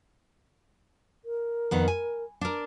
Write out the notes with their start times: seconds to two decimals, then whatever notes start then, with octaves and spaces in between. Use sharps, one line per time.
1.25 A#4
1.71 F2 D#3 B3
1.88 G#5
2.41 D4 A#4